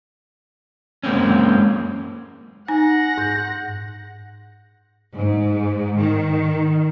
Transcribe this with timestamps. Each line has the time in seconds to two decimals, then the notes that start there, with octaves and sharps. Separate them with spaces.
1.03 F#2 G#3 A#3 C4 C#4
2.68 D#4 F#5 G#5 A#6
3.18 G#2 G6
5.15 G#2
6.00 D#3